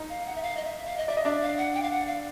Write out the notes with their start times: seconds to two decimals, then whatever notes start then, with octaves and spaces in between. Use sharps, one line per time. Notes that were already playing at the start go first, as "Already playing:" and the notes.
Already playing: D#4
0.09 F5
0.26 F#5
0.35 E5
0.42 F5
0.57 D#5
0.65 E5
0.86 F5
0.97 D#5
1.08 D5 E5
1.17 D#5
1.25 D4 D5 E5
1.42 F5
1.58 F#5
1.74 G5
1.83 F5
1.91 F#5
2.06 F5